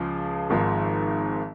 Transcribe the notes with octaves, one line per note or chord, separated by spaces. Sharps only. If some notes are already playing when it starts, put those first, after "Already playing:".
Already playing: C#2 C#3 F3
G#1 G#2 F3